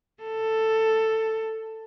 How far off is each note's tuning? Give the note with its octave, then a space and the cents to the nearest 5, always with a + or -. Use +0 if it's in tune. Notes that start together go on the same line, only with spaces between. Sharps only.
A4 +10